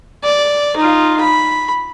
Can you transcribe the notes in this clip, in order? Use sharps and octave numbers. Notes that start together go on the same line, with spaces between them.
D5
D#4 F4
B5